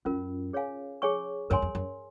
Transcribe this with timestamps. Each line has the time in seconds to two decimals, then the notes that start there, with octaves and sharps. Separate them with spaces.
0.05 F#2 C#4 F4 A#4
0.53 G#4 C#5 F5 G#5
1.02 G#4 C#5 G#5 C#6
1.50 F#2 A#4 C#5 G#5 C6
1.62 F2
1.75 F#2